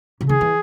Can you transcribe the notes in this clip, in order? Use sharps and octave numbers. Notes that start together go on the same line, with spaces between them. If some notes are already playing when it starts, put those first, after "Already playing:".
C#3
D#3 G#4
E3